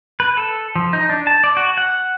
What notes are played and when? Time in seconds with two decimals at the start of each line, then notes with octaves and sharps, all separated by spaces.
0.20 B4
0.37 A4
0.76 F3
0.93 D#4
1.10 D4
1.27 A5
1.44 D5
1.57 F#4
1.77 F#5